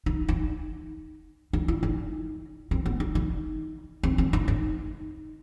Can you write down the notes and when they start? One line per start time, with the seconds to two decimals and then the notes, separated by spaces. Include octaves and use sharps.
0.06 D#4
0.28 D#4
1.53 D#4
1.68 E4
1.83 D#4
2.71 C4
2.86 B3
3.00 D#4
3.15 D#4
4.03 C4
4.18 C4
4.33 D#4
4.48 D#4